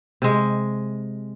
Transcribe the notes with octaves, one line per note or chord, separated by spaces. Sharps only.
C3 G#3